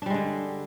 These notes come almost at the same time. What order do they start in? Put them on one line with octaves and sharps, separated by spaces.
D4 G3 G#3 D3